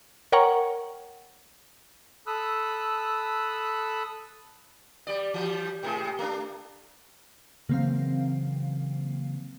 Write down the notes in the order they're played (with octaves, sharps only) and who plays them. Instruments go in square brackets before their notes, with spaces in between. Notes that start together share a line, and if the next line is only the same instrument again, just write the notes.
[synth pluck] A#4 C#5 F#5 G5 A#5 C#6
[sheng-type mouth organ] A4 B5 D#6 E6 F#6
[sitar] G3 D5
E3 G3
G#2 C3 G#4
A3 D4
[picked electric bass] C#3 E3 F#3 [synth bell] A#3 C4 F5